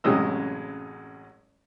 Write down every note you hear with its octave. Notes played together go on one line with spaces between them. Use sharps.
A1 F#2 C3 G#3 D#5 E6